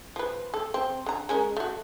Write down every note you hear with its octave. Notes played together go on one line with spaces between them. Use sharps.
F3 B4
A4
C4
D3 A#5
G#3 C#4 A#4
A3 F#4